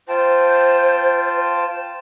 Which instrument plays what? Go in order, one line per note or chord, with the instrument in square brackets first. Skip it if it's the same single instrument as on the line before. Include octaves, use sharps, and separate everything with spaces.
[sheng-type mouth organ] F4 G5 A5 [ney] C5